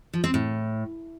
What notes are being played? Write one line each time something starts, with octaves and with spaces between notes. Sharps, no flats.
F3
C4
A2